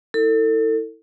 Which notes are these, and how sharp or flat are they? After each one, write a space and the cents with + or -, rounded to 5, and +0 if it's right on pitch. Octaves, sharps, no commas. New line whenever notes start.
E4 -25 A4 +30